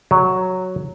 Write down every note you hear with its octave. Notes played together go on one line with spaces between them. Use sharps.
F#3